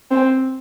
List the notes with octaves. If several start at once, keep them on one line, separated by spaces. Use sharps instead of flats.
C4